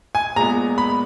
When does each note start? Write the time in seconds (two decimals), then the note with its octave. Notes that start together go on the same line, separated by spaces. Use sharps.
0.15 G#5
0.36 A#2 G#3 B3 A#5
0.78 B5